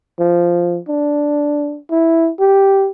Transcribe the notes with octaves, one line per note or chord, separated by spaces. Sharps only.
F3
D4
E4
G4